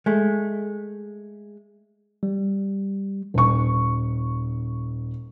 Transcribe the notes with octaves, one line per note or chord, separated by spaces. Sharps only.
G#3 A3
G3
D#1 C#6